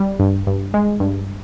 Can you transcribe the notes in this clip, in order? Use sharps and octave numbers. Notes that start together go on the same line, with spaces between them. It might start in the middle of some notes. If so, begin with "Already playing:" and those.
Already playing: G3
G2
G2
G#3
G2